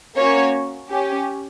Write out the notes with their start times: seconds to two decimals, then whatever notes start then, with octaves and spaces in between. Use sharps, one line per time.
0.17 A#3 C#4 F#4 C#5
0.90 C#4 G4